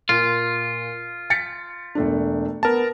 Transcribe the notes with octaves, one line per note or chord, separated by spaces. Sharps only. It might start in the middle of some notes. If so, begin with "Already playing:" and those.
A#2 F4
A6 B6 C#7
E1 A3 D4
B3 A#4 A5